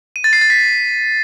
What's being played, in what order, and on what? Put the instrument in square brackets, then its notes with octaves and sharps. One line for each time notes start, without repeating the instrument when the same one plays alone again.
[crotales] D#7
A6
C7
A6
B6